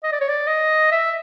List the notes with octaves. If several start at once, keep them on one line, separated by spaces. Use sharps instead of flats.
D#5
D5
C#5
D5
D#5
E5